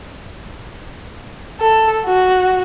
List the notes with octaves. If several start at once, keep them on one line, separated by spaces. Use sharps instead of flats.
A4
F#4